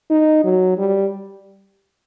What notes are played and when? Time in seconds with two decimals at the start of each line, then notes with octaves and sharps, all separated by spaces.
0.10 D#4
0.44 F#3
0.77 G3